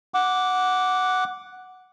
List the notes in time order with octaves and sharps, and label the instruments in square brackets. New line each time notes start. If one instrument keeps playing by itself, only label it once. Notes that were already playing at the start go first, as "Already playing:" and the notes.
[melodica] F#5 D6